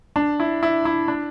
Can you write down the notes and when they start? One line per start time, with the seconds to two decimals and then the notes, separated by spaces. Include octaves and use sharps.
0.16 D4
0.40 E4
0.63 E4
0.85 E4
1.08 D4